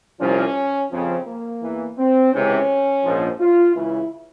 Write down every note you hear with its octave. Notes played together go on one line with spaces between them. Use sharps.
C2 A#2 F3 C#4
F2 C#3 F3 C4
A#3
E2 E3
C4
C#2 C3 E3 C#4
A#1 G#2 F3
F4
C#2 C#3 E3 E4